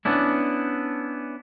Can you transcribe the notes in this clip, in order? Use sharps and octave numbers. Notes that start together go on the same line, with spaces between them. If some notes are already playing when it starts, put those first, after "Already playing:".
B3 C#4 D4 E4